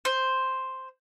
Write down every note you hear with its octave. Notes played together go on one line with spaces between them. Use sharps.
C5